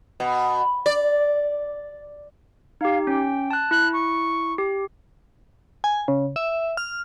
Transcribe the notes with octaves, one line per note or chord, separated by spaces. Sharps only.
B2
D5
D#4 G4 F5
C#4 G5
A5 F#6
E4 F#6
C#6
G4
G#5
C#3
E5
F6